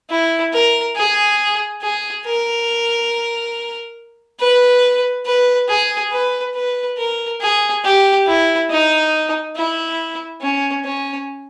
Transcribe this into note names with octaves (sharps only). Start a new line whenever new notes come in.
E4
A#4
G#4
G#4
A#4
B4
B4
G#4
B4
B4
A#4
G#4
G4
E4
D#4
E4
C#4
C#4